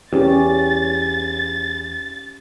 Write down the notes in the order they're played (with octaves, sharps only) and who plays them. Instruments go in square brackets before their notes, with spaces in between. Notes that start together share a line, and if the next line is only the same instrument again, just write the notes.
[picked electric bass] E2 [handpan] C#4 G4 [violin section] A6